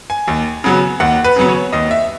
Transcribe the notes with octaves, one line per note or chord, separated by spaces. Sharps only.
G#5
D#2
C#3 F#3 B3
D#2 F#5
B4
C#3 F#3 B3
C#5
D#2 D#5
E5